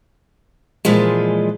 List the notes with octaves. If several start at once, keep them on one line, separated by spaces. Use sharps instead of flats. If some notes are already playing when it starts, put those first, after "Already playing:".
A#2 E3 F3 G#3